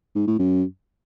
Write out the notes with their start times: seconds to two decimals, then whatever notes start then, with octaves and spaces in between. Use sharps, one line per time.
0.16 G#2
0.27 A2
0.39 F#2